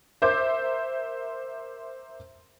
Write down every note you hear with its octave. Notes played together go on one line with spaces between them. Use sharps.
A#4 C5 E5 C6 D6 G6